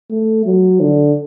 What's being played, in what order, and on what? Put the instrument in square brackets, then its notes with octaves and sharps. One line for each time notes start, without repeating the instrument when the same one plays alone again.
[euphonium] A3
F#3
D3